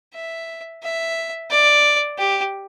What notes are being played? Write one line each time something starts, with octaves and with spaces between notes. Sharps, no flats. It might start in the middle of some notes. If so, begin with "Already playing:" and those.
E5
E5
D5
G4